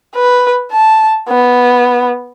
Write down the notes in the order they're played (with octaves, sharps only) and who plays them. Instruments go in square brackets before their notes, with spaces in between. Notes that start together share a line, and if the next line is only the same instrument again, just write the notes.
[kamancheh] B4
A5
B3